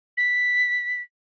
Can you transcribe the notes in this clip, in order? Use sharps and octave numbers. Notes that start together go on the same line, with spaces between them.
B6